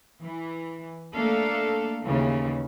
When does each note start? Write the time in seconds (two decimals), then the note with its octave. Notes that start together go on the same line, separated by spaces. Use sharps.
0.23 E3
1.14 A3 A#3 D4 A4 F5
2.03 D#2 C#3 E3